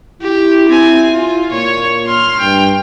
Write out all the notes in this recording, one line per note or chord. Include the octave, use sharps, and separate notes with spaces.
E4 G4
C4 G#5
F4
A#2 C#5
C6 F6
G2 G5